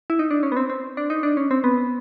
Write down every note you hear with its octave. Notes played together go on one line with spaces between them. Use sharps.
E4
D#4
D4
C#4
B3
C4
C4
D4
D#4
D4
C#4
C4
B3